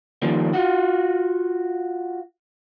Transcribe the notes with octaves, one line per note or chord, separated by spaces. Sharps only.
D#3 F3 G3 A#3
F4 F#4